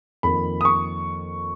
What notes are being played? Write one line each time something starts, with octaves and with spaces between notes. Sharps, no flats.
F2 D#3 A#3 B5
D#6
C#6